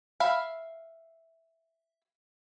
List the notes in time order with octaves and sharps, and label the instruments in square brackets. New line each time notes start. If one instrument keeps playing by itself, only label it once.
[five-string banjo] E5 F5 B5